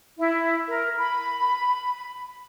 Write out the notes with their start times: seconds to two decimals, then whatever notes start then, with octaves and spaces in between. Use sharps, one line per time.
0.19 E4
0.68 A#4
0.98 B5